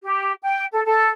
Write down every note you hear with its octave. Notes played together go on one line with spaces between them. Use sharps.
G4
G5
A4
A4